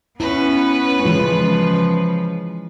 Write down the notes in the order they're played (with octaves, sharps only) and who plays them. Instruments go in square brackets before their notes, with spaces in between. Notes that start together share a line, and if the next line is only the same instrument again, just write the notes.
[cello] B3 C#4 [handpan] E4 [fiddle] B4
[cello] C#3 F3 [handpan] E3 G#3 F4